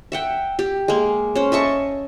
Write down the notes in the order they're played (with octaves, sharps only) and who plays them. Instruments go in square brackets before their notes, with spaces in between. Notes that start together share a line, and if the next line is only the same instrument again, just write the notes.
[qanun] E5 F#5 G5
G4
G#3 A#3
C#4 C5
D#5 E5 A5 C#6